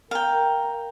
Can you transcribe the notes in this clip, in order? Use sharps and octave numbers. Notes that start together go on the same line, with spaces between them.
A#4 F5 G5